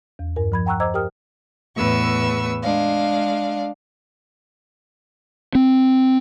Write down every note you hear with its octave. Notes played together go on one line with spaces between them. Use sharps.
E2
G2 A#4
F3 B5 G#6
F#5 G5 A#5 C#6 E6 F#6
C5 D#5 A#5 D6 E6 G#6
G4 A#4 G5 D#6 F6
E2 A2 B4 C#6 E6
G#3 D4 F5
C4